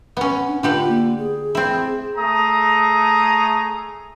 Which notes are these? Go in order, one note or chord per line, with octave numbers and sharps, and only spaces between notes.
B3 C#4
D4
D3 F4 G4 B4
A#3
G#4
C4 E4
A3 G#4 A#5 D#6